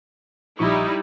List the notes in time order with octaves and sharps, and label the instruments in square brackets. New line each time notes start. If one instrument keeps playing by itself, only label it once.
[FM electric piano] A#1 F3 C#6 [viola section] G3 D#4 E4